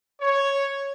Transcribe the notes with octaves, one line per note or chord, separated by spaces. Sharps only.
C#5